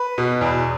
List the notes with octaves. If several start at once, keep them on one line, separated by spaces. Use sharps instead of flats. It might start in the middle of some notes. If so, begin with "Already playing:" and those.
Already playing: B4
B2
E2